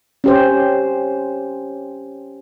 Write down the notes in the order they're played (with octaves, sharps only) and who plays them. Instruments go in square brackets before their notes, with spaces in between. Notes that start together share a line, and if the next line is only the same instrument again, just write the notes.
[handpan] C#4 G4 C5